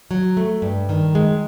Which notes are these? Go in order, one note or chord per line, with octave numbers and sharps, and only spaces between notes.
F#3
A3
G2
D#3
G#3